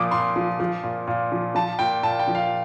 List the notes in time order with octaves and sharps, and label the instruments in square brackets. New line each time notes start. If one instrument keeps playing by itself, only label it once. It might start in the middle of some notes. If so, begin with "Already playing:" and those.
Already playing: [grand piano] A#2 F3 D6 D#6
A#2 C6
F3
F3
A#2
A#2
F3
F3 A5
A#2 G5
A#2 A5
G5
F3
F5